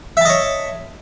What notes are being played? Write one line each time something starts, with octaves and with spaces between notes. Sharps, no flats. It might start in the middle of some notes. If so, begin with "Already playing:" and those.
C#5 D#5 E5 A5